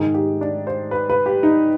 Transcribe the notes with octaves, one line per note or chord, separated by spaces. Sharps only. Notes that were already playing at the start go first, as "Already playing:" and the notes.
Already playing: G#2 D#3 G#4
G4
D4
C5
B4
B4
G4
D#4